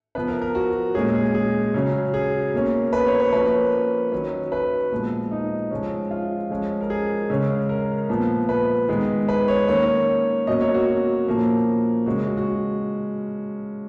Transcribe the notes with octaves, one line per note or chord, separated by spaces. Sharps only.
F3 B3 B4
A#4
A#4
F#4
A#2 G#3 C#4 G#4
G#4
G#4
C#3 F#3 C#4
G#4
B2 A#3 C#4
B4
C#5
C#5
F3 A#3 C#4 B4
D#3 F#3 C#4
B4
A#2 F3 G#3 B3
D#4
F3 G#3 C#4
F4
F3 G#3 C#4
A#4
G#4
C#3 G#3 C#4
A#4
A#2 F3 B3
B4
D#3 G#3 B3
B4
C#5
D#3 A#3 C#4 C#5
B2 F#3 A#3 C#4 D#5
C#5
F#4
A#2 F3 A#3 C#4
C#3 G#3 C#4 F#4
F#4
F#4